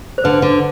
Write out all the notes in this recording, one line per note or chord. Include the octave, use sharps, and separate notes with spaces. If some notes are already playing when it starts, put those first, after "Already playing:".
C5
D3 B4
D3